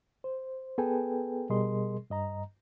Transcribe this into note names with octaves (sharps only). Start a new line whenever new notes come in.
C5
B3 G#4 A4 B4 G5 G#5
B2 G3 G#4 A#4 D#5 C6
G2 D#5 A#5